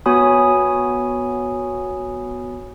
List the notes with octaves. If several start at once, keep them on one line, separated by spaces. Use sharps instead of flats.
B3 F#4 C#5 G#5 B5 D#6